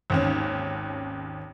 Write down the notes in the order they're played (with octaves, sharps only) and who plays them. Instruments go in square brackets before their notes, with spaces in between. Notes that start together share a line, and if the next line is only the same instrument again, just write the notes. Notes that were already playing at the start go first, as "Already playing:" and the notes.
[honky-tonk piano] G#1 D#2 C#4